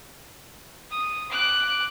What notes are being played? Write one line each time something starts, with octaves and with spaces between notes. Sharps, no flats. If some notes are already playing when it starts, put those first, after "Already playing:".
D#6
D6 F#6